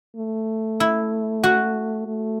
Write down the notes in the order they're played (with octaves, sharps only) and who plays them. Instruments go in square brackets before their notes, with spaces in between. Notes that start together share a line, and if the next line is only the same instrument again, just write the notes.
[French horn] A3
[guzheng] E4
F#4
[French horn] A3